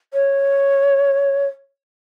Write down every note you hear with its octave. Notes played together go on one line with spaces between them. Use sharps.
C#5